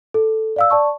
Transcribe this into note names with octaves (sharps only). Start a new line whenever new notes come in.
A4
D5 F5 E6
D5 A5 C#6